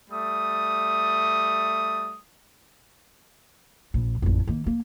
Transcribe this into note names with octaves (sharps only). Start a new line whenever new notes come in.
G3 A3 D#6
A#1
A1 F2
D#3 A#3
A#3